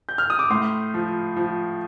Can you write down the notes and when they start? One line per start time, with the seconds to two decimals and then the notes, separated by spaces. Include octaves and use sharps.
0.09 G6
0.18 F6
0.30 D#6
0.39 D6
0.50 A2 C6
0.94 F3
1.36 F3